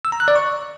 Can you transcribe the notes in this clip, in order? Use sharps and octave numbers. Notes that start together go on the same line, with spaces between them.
E6
A#5
F#6
D5
C#6